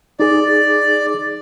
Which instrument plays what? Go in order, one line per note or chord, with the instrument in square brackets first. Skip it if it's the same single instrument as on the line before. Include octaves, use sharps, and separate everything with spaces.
[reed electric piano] D#4 G#4 [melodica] D5